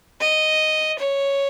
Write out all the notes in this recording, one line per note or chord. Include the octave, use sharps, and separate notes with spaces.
D#5
C#5